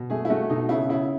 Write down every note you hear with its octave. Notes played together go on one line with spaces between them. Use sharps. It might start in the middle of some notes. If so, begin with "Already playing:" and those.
Already playing: B2
A3 G#4
E4
A3 F#4
B2 D#4
C#3 E4
C#3 E4